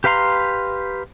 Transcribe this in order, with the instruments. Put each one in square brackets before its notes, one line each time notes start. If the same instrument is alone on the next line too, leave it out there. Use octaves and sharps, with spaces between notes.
[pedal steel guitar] G4 B4 F5 A#5 C6